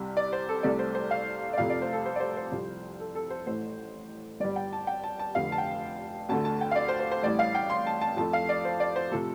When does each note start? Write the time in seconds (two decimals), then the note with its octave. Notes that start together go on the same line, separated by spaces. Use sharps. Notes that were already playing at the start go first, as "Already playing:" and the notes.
Already playing: C2 C3 G3
0.17 D5
0.33 C5
0.49 A4
0.63 C2 C3 A3 D5
0.79 C5
0.95 C5
1.11 F5
1.53 D5
1.58 F1 F2 C3 F3 A3 F5
1.70 D5
1.82 C5
1.93 A4
2.06 C5
2.16 D5
2.20 C5
2.37 C5
2.52 C2 C3 F3
3.00 A4
3.15 A4
3.30 C5
3.46 A1 A2 A3 C5
4.40 G1 G2 G3 D5
4.56 G5
4.73 A5
4.87 G5
5.04 A5
5.19 A5
5.35 F1 F2 D3 F5
5.52 A5
5.58 G5
6.29 D2 D3 A3 A5
6.45 A5
6.61 G5
6.71 F5
6.76 D5
6.88 C5
7.00 C5
7.11 C5
7.23 A1 A2 G3 D5
7.39 F5
7.55 G5
7.70 C6
7.87 A5
8.01 A5
8.17 F2 F3 A3 A5
8.33 F5
8.49 D5
8.65 C5
8.80 D5
8.96 C5
9.12 C3 F3 A3 A4